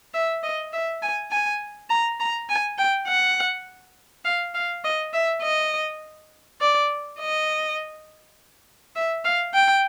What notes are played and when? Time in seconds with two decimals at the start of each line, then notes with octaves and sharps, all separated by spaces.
0.14 E5
0.43 D#5
0.73 E5
1.02 G#5
1.31 G#5
1.90 A#5
2.20 A#5
2.49 G#5
2.78 G5
3.08 F#5
4.25 F5
4.55 F5
4.84 D#5
5.14 E5
5.43 D#5
6.61 D5
7.19 D#5
8.96 E5
9.24 F5
9.54 G5